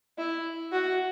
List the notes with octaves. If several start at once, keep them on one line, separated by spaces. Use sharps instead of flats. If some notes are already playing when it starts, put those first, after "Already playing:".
E4
F#4